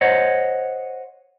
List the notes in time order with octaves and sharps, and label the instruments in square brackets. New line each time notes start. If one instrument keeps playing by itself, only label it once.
[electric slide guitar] C5 C#5 D#5 F#5